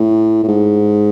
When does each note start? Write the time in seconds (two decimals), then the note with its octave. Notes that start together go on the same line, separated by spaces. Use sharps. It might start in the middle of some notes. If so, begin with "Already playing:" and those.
Already playing: A2
0.43 A2
0.48 G#2